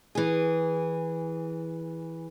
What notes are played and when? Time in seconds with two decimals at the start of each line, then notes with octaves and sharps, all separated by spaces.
0.15 E3 G#4